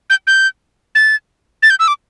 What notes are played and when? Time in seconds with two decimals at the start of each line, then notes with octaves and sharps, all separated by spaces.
0.10 G6
0.27 G6
0.95 A6
1.63 A6
1.70 G6
1.79 E6
1.88 D6